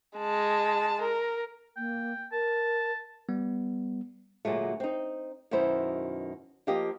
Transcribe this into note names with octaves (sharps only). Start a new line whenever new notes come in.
G#3 A5
A#4
A#3 G5
A#4 A5
G3 B3
D2 A#2 F#3 G#3 A3
C4 D#4
F#2 B2 D#3 E4 C5
F3 A#3 G4 D#5